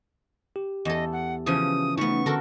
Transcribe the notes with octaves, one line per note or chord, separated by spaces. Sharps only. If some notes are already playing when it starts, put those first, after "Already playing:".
G4
E2 A4 D#5
F#5
C#3 E3 F3 D#6
C#3 A3 B3 C#4 D#4 C#6
D3 F#4 A4 A#4